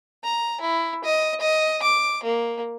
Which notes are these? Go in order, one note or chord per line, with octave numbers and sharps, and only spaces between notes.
A#5
E4
D#5
D#5
D6
A#3